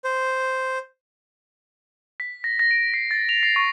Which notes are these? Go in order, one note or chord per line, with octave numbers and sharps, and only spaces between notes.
C5
B6
A#6
A#6
D7
C7
A6
F7
C7
C#6